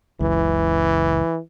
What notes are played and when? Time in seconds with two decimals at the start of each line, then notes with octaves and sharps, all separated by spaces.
0.21 F#1 C#2 E3